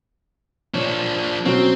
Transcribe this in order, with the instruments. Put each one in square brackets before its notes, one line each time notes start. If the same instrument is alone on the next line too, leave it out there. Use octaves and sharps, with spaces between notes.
[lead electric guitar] F3 D4 [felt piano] C#5
[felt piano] B2 F#3 C#4 [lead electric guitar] C4